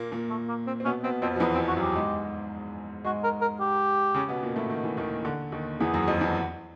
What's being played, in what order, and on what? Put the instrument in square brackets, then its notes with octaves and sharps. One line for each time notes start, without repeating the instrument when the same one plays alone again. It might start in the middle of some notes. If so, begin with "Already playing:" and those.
Already playing: [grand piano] A#2 A#3
A#2 A#3
[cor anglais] A3
A#3
C4
[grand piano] C4
[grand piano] B2 B3 [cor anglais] C#4
[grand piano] B2 B3 [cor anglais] C4
[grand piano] F2 F3 [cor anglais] C4
[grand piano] F3
[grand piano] E2 E3 [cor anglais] B3
[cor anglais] C4
[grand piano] F2 F3
[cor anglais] F#4
[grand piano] F#2 F#3
[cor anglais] G4
[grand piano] G#2 G#3
[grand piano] G#2 G#3 [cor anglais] F#4
[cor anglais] A#4
A#4
G4
[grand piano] C#3 C#4
B2 B3
A#2 A#3
A2 A3
D#3
E3
D#2 D#3
D3
D#2 D#3
[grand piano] E2 E3 [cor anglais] G#4
[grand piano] F#2 F#3
F2 F3
E2 E3